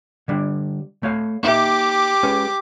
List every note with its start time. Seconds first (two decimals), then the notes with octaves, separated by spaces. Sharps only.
0.28 D3 G3 D4
1.03 A3 C#5 F5
1.43 A#3 D#4 G4 E5 D6
2.23 G#3 C#4 B4